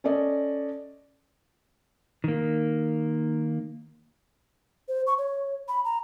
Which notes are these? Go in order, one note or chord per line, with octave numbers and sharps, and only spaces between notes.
C#4 A4 D5 D#5
D#3 A#3
C5
C#6
C#5
B5
A#5